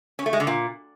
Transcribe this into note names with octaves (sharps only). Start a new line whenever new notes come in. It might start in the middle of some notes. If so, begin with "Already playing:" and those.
C#4
A3
G#3
D3
A#2